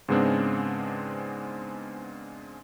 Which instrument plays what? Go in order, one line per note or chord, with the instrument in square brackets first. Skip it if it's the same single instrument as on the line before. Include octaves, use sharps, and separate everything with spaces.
[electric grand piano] G#2 C#3 G#3 B3 C4 D4